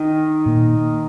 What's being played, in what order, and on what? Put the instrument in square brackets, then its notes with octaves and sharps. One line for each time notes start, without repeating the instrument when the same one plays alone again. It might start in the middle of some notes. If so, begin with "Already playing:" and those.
Already playing: [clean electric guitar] D#3 D#4
[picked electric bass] A#2 A#3